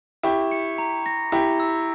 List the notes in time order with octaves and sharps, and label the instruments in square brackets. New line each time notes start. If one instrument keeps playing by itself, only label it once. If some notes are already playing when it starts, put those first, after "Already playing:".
[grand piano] E4 G4 [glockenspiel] C#6
[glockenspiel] C#7
A#5
A#6
[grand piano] E4 G4 [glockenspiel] A#5
[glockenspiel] E6